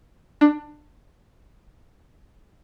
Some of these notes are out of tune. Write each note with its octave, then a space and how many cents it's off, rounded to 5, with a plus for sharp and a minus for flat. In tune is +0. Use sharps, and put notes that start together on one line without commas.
D4 +20